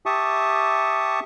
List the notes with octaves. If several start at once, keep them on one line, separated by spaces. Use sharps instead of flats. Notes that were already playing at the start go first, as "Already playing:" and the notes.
G4 E5 A5 C#6 D#6